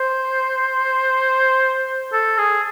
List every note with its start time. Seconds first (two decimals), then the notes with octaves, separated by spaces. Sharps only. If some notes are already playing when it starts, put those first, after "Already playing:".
Already playing: C5
2.13 A4
2.38 G#4